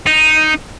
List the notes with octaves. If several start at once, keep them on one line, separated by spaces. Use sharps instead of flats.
D#4